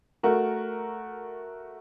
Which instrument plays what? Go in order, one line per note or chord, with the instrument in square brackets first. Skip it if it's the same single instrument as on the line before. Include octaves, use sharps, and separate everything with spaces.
[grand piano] A3 F#4 A#4